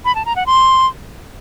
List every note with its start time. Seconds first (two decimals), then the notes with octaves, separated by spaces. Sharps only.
0.05 B5
0.15 A5
0.26 A#5
0.36 F#5
0.46 C6